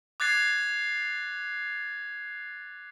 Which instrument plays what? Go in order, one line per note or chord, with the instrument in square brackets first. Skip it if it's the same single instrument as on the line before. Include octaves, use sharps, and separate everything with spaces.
[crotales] D6 F#6 G#6 A6 C7